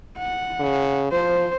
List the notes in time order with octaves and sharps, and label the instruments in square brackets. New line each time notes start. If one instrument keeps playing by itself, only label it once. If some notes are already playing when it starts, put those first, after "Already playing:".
[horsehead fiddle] F#5
[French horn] C#3
[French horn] F3 [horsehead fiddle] C5